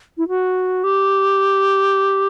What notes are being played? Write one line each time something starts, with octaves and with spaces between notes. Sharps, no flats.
E4
F#4
G4